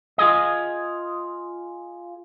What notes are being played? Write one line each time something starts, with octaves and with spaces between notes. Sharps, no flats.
F4 G#4 D#5